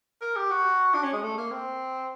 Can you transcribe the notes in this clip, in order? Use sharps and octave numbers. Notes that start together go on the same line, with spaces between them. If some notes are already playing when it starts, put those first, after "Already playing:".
A#4
G4
F#4
D4
C#4
G#3
A3
A#3
C4